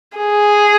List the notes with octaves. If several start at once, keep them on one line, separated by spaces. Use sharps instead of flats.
G#4